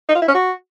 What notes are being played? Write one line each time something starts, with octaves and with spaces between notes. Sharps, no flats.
D#4
F4
E4
C#4
F#4